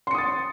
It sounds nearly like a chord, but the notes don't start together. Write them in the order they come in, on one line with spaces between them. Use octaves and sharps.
C6 C#7 D#6 A6